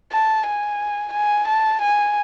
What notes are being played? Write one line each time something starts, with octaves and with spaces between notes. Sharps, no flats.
A5
G#5
G#5
A5
G#5